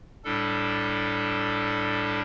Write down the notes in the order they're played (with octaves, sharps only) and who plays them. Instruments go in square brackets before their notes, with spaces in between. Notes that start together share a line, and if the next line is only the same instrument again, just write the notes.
[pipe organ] A2 G3 D4 A4